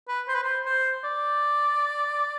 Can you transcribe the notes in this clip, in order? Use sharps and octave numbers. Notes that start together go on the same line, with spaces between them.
B4
C5
B4
C5
C5
D5